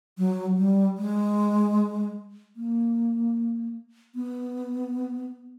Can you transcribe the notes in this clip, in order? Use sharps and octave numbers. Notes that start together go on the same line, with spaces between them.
F#3
G3
G#3
A#3
B3